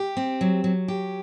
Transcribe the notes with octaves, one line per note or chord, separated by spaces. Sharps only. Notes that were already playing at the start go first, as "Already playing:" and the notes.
Already playing: G4
C4
F#3
F#3
G4